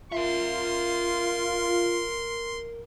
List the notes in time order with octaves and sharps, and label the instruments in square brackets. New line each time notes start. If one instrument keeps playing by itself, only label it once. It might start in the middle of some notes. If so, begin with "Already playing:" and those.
[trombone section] F4 [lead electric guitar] A#4 E5 [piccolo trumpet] C6